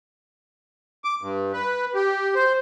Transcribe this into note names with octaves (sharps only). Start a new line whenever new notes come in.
D6
G2
B4
G4
C5